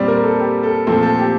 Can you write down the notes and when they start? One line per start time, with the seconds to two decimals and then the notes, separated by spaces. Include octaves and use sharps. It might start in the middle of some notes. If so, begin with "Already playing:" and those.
Already playing: A#2 G3 C4 D5
0.08 A#4
0.23 A4
0.40 G4
0.63 A4
0.87 A#2 F3 A3 C4 A4
1.03 A4
1.19 G4